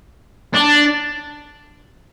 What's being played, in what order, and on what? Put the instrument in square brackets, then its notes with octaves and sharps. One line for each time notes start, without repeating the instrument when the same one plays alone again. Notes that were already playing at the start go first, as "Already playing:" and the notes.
[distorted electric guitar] D4